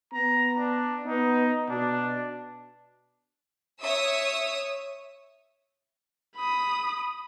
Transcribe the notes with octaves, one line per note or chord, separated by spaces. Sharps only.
B3 A#5
D4
B3 D#4
B2 D4
C#5 E5 D#6 E6
B5 D#6